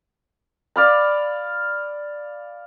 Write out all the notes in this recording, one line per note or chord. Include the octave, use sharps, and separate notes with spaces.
D5 F5 B5